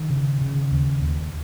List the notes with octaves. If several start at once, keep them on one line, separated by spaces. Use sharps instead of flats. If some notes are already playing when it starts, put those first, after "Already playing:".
Already playing: D#3
C#3
C#3
D#2
D#2